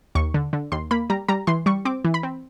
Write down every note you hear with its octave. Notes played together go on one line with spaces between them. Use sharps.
D#2 C#6
D3
D3
D#2 C6
A#3 B5
G3 A#5
G3 A#5
E3 C6
G3 C#6
C4 D6
E3
B5
C4